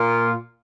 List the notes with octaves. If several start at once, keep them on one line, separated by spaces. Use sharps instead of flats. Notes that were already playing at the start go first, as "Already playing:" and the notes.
Already playing: A#2 A#3 F4